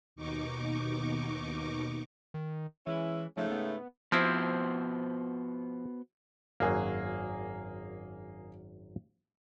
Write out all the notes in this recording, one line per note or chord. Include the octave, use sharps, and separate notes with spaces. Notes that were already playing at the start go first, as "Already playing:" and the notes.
D#2 B2 D#4 C#6 D6
D#3
E3 G#3 C#4 E4
G#2 C#3 F3 A3
B3
F3 B3 C4 E4 F#4 C5
G#1 F#2 F#3 A#3 G#4